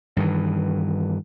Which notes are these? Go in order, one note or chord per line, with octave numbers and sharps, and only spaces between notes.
G2 D#3 E3